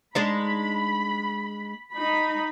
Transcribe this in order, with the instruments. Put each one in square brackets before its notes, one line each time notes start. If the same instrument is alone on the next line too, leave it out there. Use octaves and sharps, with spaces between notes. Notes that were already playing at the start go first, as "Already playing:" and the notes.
[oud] G#3 D4 D#4 [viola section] B5
[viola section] D#4 B5